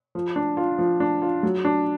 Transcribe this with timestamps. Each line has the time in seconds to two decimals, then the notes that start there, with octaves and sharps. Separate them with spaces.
0.15 F3
0.36 D4
0.57 F4
0.78 F3
1.00 D4
1.22 F4
1.43 F#3
1.65 D4